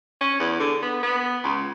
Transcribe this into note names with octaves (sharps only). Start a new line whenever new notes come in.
C#4
E2
D3
B3
B3
C#2